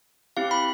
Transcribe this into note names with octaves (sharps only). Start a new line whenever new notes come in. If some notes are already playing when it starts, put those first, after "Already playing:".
C4 E4 G4 F5
B5